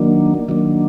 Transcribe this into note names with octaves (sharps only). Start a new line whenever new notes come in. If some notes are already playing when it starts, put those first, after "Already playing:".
Already playing: D#3 F#3 A#3 D4
D#3 F#3 A#3 D4